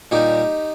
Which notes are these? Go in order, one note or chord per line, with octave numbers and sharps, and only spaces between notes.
A#2 G3 D#4 G4